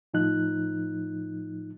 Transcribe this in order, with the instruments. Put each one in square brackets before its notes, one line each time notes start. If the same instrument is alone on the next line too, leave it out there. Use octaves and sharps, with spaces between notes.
[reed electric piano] A2 F3 D#4 F#6